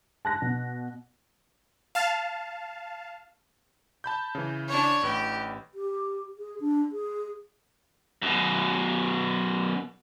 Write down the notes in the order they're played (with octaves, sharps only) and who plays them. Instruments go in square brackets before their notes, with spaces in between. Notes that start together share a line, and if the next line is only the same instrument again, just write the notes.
[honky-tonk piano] A5 F#6 A#6
B2
[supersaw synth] F5 A5
[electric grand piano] A5 B5 G6
C#3 E3
[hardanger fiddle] D4 C#5
[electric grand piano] A1 B4 [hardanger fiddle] G4
[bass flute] G4
G#4
D4
G#4
[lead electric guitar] F#2 B2